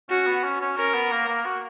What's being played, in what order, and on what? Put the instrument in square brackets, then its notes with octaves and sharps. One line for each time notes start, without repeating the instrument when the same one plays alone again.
[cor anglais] C#4 [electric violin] F#4
[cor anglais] B3
C#4
C#4
[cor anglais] C#4 [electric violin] A#4
[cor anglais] B3
A#3
A#3
F#4